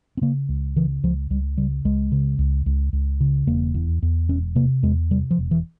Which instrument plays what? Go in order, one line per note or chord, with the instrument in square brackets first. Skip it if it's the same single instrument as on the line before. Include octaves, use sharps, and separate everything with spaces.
[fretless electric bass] C4
C#3 A#3
C#2
C#3 E3
C#2 F3
C#2 G3
C#3 G3
C#2 G#3
C#3
C#2
C#2
C#2
C#3
E1 A#3
E2
E2
E1 C#4
C3 A#3
E2 G#3
C3 G3
F3
E1
E3